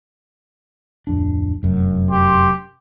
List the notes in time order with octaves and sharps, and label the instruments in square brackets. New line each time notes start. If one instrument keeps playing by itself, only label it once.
[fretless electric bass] D1 F2 D4
F1 F#2
[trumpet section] G4 C6